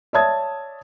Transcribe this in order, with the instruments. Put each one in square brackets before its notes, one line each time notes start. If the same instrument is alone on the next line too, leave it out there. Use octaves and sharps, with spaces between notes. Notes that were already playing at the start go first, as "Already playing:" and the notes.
[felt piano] C#5 D5 E5 A5 D#6 G#6